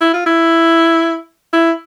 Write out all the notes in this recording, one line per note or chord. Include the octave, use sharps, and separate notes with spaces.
E4
F4
E4
E4